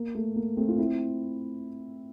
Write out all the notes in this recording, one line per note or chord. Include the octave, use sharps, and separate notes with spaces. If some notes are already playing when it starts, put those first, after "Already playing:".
Already playing: A#3
A3
A#3
A3 C4
F4
C4 E4